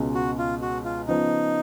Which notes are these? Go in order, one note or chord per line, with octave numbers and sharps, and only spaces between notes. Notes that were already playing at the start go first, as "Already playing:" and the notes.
Already playing: C#2 B2 G#3 C#4
F#4
F4
F#4
F4
C#3 F3 B3 D#4